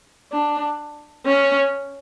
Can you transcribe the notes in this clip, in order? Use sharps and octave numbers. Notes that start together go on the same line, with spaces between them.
D4
C#4